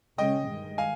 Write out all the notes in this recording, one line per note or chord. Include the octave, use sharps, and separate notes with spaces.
C#3 G#3 C#4 D#5 G5
G2 D#3 G#3
F5 G#5